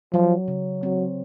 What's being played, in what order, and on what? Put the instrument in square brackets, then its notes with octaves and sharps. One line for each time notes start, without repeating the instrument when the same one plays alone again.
[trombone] F3 [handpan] F#3
[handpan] C#3
[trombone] F#3 [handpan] C4